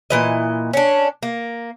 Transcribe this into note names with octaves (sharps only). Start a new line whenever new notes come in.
A#2 E3 D#5
C#4 D4
A#3